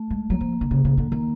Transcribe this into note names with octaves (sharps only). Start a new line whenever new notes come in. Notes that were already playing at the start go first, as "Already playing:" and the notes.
Already playing: A3
G#3
F#3 A#3
F3
D3
C#3
C#3
D3
D#3 A#3